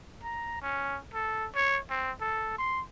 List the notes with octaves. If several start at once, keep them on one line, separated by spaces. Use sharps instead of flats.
A#5
C#4
A4
C#5
C4
A4
C6